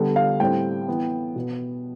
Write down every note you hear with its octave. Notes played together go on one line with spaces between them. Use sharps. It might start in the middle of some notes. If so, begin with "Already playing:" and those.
Already playing: D3 G3 B3
F5
A2 G3 C4 G5
E3 B3
B2 B3